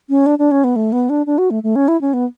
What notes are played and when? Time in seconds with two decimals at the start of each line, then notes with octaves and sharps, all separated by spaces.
0.09 C#4
0.26 D4
0.39 D4
0.51 C#4
0.64 B3
0.76 A3
0.92 B3
1.09 D4
1.26 D4
1.38 F#4
1.50 A3
1.63 A3
1.76 C#4
1.88 E4
2.01 C#4
2.13 B3